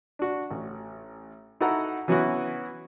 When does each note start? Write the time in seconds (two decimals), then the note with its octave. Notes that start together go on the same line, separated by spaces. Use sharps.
0.19 D4 F#4
0.51 A1
1.60 D#4 E4 F#4 A4 F#5 A#5
2.08 E3 F#3 B3 C#4 E4 F#4